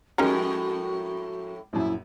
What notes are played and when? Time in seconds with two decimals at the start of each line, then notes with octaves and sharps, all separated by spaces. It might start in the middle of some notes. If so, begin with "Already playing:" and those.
0.18 F2 A2 G#3 C#4 D#4 F#4 G4 A#4
1.73 A#1 F#2 E4